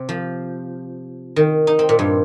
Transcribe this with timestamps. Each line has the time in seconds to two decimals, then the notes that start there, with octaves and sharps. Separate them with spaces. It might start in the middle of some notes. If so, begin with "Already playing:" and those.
Already playing: C3
0.09 F3
1.36 D#3
1.67 D#4
1.79 C4
1.89 A#2
1.99 G2